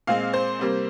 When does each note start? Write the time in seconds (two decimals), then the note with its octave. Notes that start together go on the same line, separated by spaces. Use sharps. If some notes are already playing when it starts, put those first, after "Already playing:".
0.07 A#2 G#3 C4 F5
0.33 C5
0.59 C3 G3 A#3